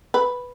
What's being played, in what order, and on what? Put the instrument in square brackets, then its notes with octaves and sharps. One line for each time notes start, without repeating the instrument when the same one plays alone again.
[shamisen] B4